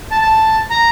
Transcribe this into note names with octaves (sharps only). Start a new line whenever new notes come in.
A5
A5
A#5